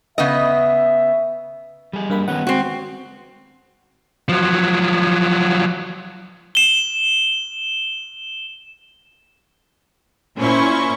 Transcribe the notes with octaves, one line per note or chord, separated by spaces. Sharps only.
C#3 B3 D#5 E5
G3 G#4
G2 A#3 B5
D#3 B3 C#4 F#5
G#3 C4 F#4
F3 F#3
E7 G7
A#2 C#4 E4 C5 C#6